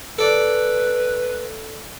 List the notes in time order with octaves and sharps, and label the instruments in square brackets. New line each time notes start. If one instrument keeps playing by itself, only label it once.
[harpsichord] A4 D5 [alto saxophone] B4